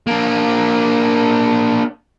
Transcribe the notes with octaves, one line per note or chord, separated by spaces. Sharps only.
A#3 D4